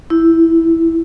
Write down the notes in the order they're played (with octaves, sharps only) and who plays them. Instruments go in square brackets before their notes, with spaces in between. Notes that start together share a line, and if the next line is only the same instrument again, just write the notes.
[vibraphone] E4